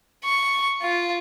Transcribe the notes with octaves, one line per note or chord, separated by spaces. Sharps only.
C#6
F4